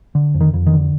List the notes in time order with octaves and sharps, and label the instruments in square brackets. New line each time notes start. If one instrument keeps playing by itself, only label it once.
[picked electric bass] D3
F2
D#3
F2
D#3
D3